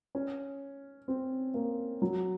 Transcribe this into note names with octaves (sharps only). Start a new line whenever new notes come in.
C#4
C4
A#3
F#3